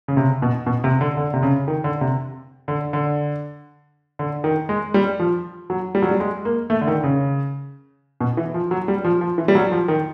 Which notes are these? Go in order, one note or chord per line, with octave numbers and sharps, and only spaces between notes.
C#3
C3
B2
B2
C3
D3
D3
C3
C#3
D#3
D3
C3
D3
D3
D3
D#3
G#3
G3
F3
F#3
G3
F#3
G3
G#3
A#3
A3
D3
D#3
C#3
B2
E3
F3
F#3
G3
F3
F3
E3
G3
F#3
F3
D#3